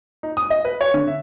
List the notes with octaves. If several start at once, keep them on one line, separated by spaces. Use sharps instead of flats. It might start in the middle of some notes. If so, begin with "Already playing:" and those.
D#4
D#6
D#5
B4
C#5
D3
E5